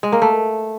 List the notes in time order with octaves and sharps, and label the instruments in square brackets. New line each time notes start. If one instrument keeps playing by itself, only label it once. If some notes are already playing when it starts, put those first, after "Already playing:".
[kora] G#3
A#3
A3